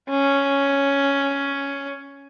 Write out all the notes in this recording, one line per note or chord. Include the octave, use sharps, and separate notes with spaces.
C#4